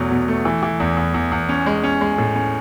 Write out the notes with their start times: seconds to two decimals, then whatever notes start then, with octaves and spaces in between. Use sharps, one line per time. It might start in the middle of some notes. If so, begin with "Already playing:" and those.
Already playing: E2 B2 F#3 A3
0.10 B2
0.28 A3
0.45 E3
0.63 E3
0.80 E2
0.97 E2
1.14 E2
1.32 E2
1.49 C#4
1.66 G#3
1.84 C#4
2.01 G#3
2.18 A2
2.35 C#4